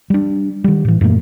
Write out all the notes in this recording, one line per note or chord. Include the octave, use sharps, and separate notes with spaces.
G3 D4
D#3 G3
A2 E3
F#2 A#2 A3 A#3